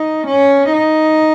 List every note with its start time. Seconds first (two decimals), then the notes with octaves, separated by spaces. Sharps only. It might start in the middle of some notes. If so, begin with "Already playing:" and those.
Already playing: D#4
0.27 C#4
0.72 D#4